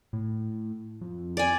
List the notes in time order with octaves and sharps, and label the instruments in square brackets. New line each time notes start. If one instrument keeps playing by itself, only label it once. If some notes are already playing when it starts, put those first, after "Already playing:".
[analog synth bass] A2
F2
[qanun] D5 G#5